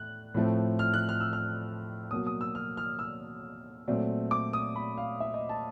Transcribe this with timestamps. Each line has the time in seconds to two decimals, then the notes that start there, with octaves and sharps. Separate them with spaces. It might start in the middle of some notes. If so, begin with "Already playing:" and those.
Already playing: A2 A3 F#6
0.34 A2 F3 A3 C4
0.79 F6
0.94 F#6
1.09 F6
1.20 E6
1.33 F6
2.11 B2 F#3 A#3 D#6
2.26 D#6
2.41 E6
2.55 F6
2.77 F6
2.99 E6
3.88 A#2 F#3 A3 C4
4.31 D6
4.53 D#6
4.76 B5
4.97 F5
5.20 E5
5.34 D#5
5.49 A5